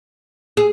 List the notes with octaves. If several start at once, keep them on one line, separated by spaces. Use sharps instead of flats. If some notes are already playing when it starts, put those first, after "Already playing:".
G#4